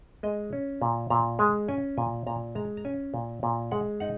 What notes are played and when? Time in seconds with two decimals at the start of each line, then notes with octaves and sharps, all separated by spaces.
0.23 G#3 D#5
0.53 C#4
0.82 A#2
1.10 A#2 A#5
1.39 G#3 G#5
1.68 C#4 G#5
1.97 A#2 G#5
2.27 A#2 A#5
2.55 G#3 A#5
2.77 A#5
2.85 C#4 G#5
3.14 A#2
3.43 A#2
3.72 G#3 F#5
4.00 D#4 F#5